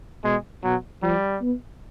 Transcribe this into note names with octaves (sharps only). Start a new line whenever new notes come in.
B2 G#3
B2 F#3
F3 G3
B3